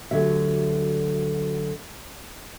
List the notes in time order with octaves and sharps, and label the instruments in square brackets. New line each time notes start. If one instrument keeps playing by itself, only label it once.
[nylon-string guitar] D2 D3 F#3 G4 E5